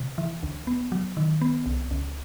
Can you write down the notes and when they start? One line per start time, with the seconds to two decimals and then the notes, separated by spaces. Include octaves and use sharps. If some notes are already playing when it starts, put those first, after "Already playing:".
Already playing: C3
0.18 E3
0.43 D2
0.67 B3
0.92 F#3
1.17 D#3
1.41 B3
1.66 C2
1.91 C#2